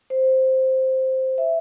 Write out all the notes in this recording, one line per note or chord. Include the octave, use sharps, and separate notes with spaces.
C5
E5